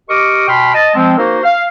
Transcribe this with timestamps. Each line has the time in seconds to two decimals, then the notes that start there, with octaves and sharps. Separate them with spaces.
0.08 G4 A#4 D#5 C#6 D6
0.47 B2 G5 B5 C6 F6
0.73 D#5 A5
0.94 F3 G#3 C4
1.18 A#3 D#4 F#4 A#4 C5
1.44 F5